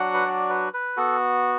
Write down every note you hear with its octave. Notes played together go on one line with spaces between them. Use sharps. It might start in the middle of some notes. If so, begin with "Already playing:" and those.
Already playing: F#3 D4 F#4 F#5
B4
D5
B4
B4
B3 F#4 A4